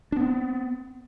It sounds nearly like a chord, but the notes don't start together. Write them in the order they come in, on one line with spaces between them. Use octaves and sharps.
D4 B3 C4